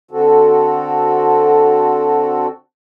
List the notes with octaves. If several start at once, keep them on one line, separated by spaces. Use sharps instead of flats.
D3 C4 F#4 A4